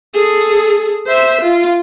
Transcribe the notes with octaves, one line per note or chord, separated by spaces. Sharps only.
G#4 A4
C5 E5
F4